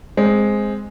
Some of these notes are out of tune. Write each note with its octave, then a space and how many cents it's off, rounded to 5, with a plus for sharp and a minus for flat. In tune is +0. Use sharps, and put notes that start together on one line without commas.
G#3 +0 C4 +0